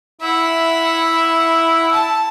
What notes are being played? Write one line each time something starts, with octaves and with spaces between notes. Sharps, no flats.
E4 E5 F#5
A5